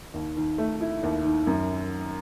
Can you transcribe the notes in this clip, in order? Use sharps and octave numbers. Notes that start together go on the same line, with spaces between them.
D#2
D#3
A3
E4
D#2
D#3
F#2